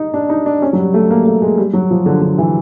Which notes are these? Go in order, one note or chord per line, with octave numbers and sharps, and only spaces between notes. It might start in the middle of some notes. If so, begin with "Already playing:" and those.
Already playing: D#4
D4
D#4
D4
C#4
F#3
G3
A3
A#3
A3
G#3
G3
F#3
F3
D3
D3
E3